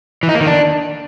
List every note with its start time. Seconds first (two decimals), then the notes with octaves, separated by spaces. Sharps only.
0.23 E3
0.29 D#4
0.35 A#3
0.41 D#3
0.47 D4